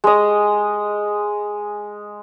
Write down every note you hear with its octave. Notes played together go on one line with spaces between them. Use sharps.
G#3 D#5